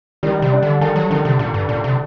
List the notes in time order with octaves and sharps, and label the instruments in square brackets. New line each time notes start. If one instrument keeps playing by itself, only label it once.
[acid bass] D#3 [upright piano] G3
[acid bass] C3
[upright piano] D4
[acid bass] D3
[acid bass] D#3 [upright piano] A4
[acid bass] F#3
[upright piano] D3 [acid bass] D#3
[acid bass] C3
[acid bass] A#2 [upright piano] D3
[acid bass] G2
[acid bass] A#2 [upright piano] D4
[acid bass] C3